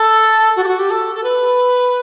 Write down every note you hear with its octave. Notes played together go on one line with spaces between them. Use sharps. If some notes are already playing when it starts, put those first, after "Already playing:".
Already playing: A4
F#4
G4
F#4
G4
A4
A4
B4